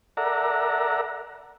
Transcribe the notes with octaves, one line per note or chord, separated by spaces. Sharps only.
A4 A#4 D5 E5 F#5 A#5